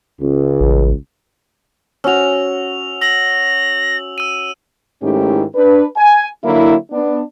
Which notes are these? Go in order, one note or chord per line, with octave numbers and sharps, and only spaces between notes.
C#2
A1
C#4 F#4 E6 F7
E6 A#6 F#7
E6 D#7
G#2 D#3 A3 C#4 E4 G4
D4 B4
G#5
D3 F#3 A#3 E4
B3 D4